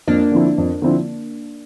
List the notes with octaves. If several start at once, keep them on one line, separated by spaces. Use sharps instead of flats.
F2 A#3 D4
D3 F3 C4 E4
F2
D3 F3 C4 E4